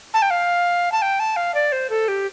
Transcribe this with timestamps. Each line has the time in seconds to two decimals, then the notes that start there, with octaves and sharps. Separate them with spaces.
0.14 A5
0.22 G5
0.31 F5
0.92 A5
1.02 G5
1.20 A5
1.36 F5
1.54 D5
1.72 C5
1.90 A4
2.08 G4